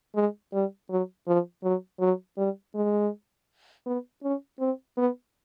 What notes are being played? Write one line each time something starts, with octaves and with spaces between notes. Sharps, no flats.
G#3
G3
F#3
F3
F#3
F#3
G3
G#3
B3
C#4
C4
B3